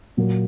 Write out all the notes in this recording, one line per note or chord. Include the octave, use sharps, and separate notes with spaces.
A#2 F#3 A#3